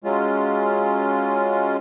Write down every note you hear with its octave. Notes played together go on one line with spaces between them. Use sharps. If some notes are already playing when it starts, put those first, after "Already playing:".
F#3 G#3 C#4 F4